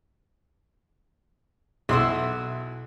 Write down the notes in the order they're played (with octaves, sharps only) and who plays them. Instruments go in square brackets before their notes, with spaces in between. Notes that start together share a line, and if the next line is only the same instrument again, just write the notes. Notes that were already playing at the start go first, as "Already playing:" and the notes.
[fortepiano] B1 C6 [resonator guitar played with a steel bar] E4 F#4